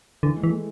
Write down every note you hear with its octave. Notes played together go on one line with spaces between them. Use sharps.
D3 E3
G#3
E3
A3